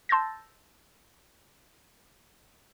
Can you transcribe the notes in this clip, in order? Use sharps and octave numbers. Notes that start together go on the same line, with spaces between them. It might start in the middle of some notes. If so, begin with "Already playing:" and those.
A5 C6 E6 G6 A6 A#6